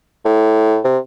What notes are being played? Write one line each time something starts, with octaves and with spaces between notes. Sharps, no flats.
A2
C3